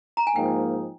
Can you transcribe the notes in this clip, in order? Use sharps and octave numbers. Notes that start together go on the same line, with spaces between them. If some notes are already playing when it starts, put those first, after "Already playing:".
A#5
G#5
G#2 F3 A#3 D#4 G5